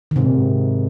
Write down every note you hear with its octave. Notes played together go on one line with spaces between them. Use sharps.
D#3
G#2 C3
A#2
G#2